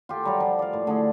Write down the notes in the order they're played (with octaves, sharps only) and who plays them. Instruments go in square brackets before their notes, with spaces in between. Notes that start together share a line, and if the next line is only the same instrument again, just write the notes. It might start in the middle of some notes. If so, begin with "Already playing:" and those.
[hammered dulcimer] F4 G4 A4
F#3 G3 A#5
F3
D5 F5
A2
D3 A3 G#4